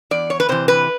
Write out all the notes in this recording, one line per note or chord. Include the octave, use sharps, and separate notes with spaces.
E2 D5
C#5
B4
C3 E3 C5
B4